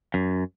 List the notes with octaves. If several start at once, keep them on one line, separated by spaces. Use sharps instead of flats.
F#2